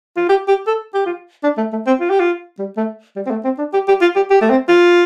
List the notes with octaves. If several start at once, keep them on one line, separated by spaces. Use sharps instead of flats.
F4
G4
G4
A4
G4
F4
D4
A3
A3
C4
F4
G4
F4
G3
A3
G3
C4
A3
C4
D4
G4
G4
F4
G4
G4
A3
C4
F4